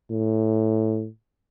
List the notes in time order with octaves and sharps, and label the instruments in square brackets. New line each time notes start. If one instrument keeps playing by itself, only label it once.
[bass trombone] A2